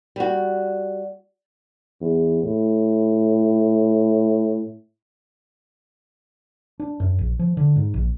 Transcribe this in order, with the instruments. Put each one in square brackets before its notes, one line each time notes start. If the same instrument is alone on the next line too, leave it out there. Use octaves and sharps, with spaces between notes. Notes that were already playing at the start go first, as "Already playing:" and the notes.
[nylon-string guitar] G3 F#4
[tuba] E2
A2
[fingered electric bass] D4
F#2
A#1
F3
D3
G#2
A#1